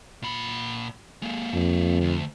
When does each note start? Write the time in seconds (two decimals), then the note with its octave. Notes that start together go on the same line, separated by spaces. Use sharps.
0.22 A#2 B5
1.22 G#3 A#3
1.54 F2
2.01 D2